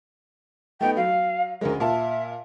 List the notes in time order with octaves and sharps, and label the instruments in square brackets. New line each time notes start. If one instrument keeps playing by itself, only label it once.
[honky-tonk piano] A3 B3 D#4 [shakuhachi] G5
[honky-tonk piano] F#3 [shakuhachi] F5
[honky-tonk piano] D2 C#3 G#3 [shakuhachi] A#4
[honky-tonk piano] A#2 F5 A5 [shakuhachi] E5